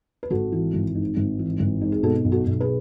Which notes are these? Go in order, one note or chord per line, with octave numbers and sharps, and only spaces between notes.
B4
G#1 F#4 A4
E3
G#1
G#2
G#1
E3
G#1
G#2
G#4
B2 F#4 A4
B1
F#4 A4
B1
G#4 B4